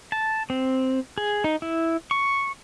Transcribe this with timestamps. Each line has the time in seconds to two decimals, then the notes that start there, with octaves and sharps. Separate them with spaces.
0.12 A5
0.50 C4
1.18 G#4
1.44 D#4
1.62 E4
2.11 C#6